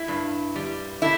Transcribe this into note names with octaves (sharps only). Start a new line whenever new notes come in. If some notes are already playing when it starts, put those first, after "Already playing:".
Already playing: E4
G2
G3
A3 E4